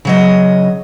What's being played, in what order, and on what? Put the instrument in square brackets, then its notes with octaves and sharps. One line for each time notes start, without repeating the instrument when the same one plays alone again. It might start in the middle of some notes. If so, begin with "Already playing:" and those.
[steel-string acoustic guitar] C#3 F#3 D#5